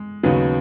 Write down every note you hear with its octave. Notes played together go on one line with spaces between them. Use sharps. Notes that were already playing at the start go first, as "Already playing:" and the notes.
Already playing: G#3
D#2 C#3 F#3 B3 D#4